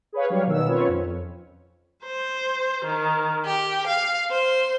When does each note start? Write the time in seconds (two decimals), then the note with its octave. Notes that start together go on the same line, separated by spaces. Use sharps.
0.13 G#4 B4 C#5 F5
0.30 F#3 G3 D4 G4 C#5 F5
0.47 B2 D#3 B3 A#4 E6
0.68 C4 C#4 F4 B4 C#5
0.89 F2
2.02 C5
2.83 D#3
3.45 G4
3.87 F5
4.30 C5